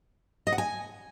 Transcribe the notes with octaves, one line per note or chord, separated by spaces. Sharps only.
D#5
F#5
G#5